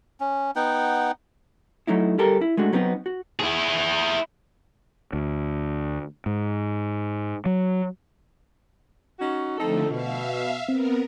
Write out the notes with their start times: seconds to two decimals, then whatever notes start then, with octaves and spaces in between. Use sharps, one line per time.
0.20 C#4
0.56 B3 D#4 F#5 G5
1.87 F#3 A3 D#4 E4
2.18 G3 G4 A4 A#4
2.41 E4
2.57 G#3 A3 D4 F#4
2.72 F#3 G3 B3 C4 D#4
3.06 F#4
3.40 E4 G#4
5.13 D2
6.26 G#2
7.46 F#3
9.19 C#4 D#4 F#4
9.58 D3 F3 A3 C4 D#4 A4
9.90 B2 E5 F5
10.69 B3 C4 A#4